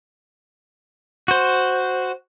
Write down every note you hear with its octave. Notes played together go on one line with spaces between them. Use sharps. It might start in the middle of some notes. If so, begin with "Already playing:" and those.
F#4 C5